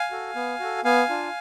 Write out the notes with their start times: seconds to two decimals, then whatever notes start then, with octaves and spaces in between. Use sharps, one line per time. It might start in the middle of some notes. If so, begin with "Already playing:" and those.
Already playing: F5 G#5
0.11 F#4 A4
0.35 B3
0.60 F#4 A4
0.84 B3 F5 G#5
1.09 D4 F4